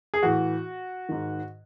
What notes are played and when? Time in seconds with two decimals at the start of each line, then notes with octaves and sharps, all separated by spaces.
0.14 G#4
0.23 A2 E3 F#4
1.09 G#2 D#3